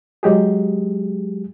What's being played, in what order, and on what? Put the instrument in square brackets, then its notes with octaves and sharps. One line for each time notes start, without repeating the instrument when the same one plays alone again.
[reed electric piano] F#3 G#3 G4 G#4